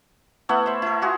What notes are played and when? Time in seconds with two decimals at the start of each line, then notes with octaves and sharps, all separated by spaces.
0.49 A3 B3 E4 F#5
0.66 C5 E5
0.82 E4 A#4
1.02 F4 F#4 G#4